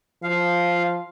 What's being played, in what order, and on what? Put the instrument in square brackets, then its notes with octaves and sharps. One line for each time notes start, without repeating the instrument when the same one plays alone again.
[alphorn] F3 [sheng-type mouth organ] F5